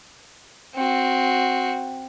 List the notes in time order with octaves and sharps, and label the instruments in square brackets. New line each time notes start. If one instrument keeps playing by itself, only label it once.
[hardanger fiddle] C4 F#4